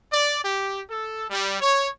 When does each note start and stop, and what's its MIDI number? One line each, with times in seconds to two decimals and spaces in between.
0.12 0.40 74
0.43 0.82 67
0.89 1.27 69
1.29 1.57 55
1.61 1.87 73